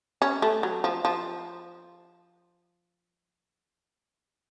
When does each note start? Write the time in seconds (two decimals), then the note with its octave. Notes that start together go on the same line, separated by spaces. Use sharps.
0.22 C#4
0.42 A3
0.63 F#3
0.84 F3
1.05 F3